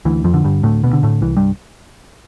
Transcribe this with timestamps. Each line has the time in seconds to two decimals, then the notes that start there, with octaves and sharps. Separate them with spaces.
0.05 D2 E3
0.24 F2 F3
0.34 D3
0.44 G2 G3
0.63 D2 A2 A3
0.84 B2 B3
0.93 D3
1.03 A2 A3
1.22 C2 E3
1.37 G2 G3